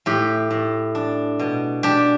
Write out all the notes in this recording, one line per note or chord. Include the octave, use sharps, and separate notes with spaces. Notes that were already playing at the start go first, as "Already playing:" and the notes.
A2 G4
A2
D4
B2
D4 G4